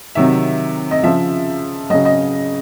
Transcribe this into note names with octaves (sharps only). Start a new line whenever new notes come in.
C3 D#3 F#3 E5
D#5
C#3 F3 E5
C#3 F#3 D#5
D#5